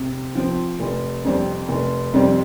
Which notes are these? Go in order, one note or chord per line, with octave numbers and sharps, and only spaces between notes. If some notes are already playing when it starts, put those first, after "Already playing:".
Already playing: C3
F3 C4
F1
F2 C3 G3 C4
F1
F2 C3 G3 C4